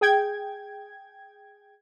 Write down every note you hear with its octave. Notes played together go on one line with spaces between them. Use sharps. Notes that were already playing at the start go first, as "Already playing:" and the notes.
G#4 G5 G#6